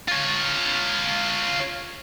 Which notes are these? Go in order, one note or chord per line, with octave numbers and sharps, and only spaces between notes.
F4 C#5